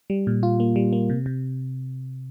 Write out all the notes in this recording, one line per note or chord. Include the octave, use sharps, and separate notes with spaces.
G3
A#2
F4
A#3
G3
A#3
C3
C3